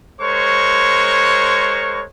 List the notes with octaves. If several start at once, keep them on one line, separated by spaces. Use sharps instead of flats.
G#3 A#4 C5 C#5 C#6